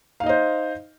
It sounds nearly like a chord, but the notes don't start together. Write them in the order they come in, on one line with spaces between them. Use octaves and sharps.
F5 D#4 D#5 C5